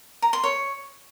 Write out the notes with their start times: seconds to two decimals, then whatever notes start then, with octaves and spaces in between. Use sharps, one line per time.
0.22 A#5
0.33 C6
0.44 C#5